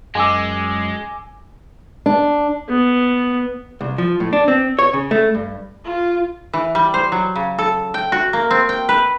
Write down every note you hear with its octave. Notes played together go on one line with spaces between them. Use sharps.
F#2 G#3 G#5 D6 E6
D4
B3
C2
F3
A2
D4
C4
C#5
C#3
A3
G2
F4
E3
G3
C5
F#3
C#3
A4
G5
F#4
A#3
C4
G5
B4